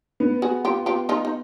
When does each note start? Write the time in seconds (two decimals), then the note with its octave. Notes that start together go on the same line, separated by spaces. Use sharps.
0.20 B3
0.42 F#4 G#4
0.65 F4 G4
0.86 F4 G4
1.09 D#4 F4
1.25 D#4